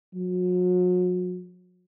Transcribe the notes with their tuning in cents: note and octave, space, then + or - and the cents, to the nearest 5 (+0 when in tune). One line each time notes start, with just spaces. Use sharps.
F#3 -40